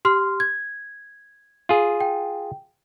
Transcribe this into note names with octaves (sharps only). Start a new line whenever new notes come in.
G4 C6 F6
G#6
F4 G#4
G5